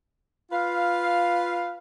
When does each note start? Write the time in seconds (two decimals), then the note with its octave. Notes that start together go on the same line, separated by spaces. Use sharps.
0.51 F4 B4 F5